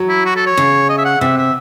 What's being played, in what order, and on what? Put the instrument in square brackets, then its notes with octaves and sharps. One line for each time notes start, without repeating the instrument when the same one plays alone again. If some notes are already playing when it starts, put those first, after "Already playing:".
Already playing: [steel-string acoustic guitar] F#3
[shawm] E4
F#4
A4
C#5
[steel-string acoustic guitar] C#3
[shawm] D#5
E5
F#5
[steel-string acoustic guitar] C3 [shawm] E5
[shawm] E5